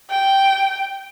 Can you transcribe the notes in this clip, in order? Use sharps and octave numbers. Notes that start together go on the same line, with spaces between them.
G5